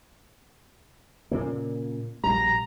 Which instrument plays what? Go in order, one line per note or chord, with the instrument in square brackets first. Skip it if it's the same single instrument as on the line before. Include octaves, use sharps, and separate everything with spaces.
[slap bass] A#2 C#3 A#3
[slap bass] A#1 B2 G3 [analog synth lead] A#5